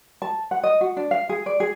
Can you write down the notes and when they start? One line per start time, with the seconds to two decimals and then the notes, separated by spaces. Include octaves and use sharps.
0.22 A5
0.51 F#5
0.63 D#5
0.81 F#4
0.97 D4
1.11 F5
1.29 G#4
1.46 D5
1.60 G#4